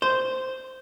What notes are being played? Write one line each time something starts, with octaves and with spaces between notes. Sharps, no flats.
C5